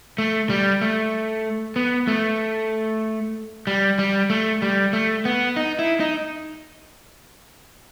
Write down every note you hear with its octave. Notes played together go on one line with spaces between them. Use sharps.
A3
G3
A3
B3
A3
G3
G3
A3
G3
A3
B3
D#4
E4
D#4